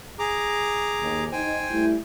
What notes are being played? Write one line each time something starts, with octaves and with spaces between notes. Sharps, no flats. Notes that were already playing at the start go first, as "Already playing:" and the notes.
G#4 A#5 D6
D#2
D#4 C5 G5 G#5
G3 A3 E4